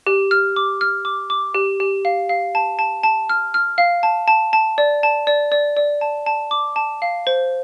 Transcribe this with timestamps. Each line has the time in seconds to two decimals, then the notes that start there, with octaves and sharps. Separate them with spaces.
0.07 G4
0.31 F6
0.56 D6
0.81 F6
1.05 D6
1.30 D6
1.55 G4
1.80 G4
2.05 F5
2.29 F5
2.55 A5
2.79 A5
3.03 A5
3.29 F6
3.54 F6
3.78 F5
4.03 A5
4.28 A5
4.53 A5
4.78 D5
5.03 A5
5.27 D5
5.52 D5
5.77 D5
6.01 A5
6.26 A5
6.51 D6
6.76 A5
7.02 F5
7.27 C5